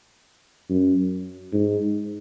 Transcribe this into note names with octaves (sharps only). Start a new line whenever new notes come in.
F#2
G#2